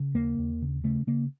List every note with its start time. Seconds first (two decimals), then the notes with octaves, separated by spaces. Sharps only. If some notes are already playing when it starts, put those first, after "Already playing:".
Already playing: C#3
0.15 D#2 A#3
0.38 D#2
0.62 C#3
0.84 C#3 A3
1.07 C#3 A#3